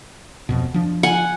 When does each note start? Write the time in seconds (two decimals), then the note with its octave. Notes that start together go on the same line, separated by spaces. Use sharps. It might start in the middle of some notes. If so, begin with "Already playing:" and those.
0.49 D1 F2 B2
0.74 F3 D4
1.03 F#5 G#5